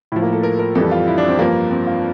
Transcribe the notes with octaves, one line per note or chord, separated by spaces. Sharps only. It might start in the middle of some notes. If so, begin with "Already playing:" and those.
A2 F3 E4
A#3
A4
A#4
A#4
F2 E3 G3 A4
F4
E4
D4
C4
G2 F3 A#3
C4
F4